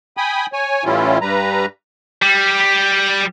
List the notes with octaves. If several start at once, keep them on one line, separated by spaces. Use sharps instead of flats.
G5 G#5 B5 D#6
C#5 G#5
A2 E3 G3 C#4 E4 F4
G2 G3 B4 A#5
G3